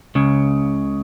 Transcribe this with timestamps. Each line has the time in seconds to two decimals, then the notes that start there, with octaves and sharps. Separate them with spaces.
0.15 C#2 C#3